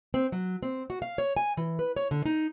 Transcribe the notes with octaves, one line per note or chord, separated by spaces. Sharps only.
C4
F#3
C4
F#4
F5
C#5
G#5
E3
B4
C#5
D3
D#4